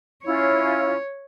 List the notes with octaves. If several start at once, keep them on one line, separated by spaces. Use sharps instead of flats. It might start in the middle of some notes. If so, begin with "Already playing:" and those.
C#4 E4 F4 C#5